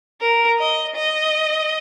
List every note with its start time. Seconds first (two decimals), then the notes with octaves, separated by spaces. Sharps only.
0.21 A#4
0.59 D#5
0.96 D#5